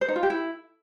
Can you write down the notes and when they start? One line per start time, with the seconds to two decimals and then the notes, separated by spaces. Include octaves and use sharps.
0.01 C5
0.08 D#4
0.16 F4
0.23 G4
0.30 E4